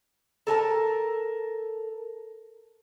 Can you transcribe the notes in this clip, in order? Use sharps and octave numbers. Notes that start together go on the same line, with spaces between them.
A4 A#4 G#5 A5